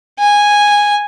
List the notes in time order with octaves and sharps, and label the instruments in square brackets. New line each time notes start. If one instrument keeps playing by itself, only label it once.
[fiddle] G#5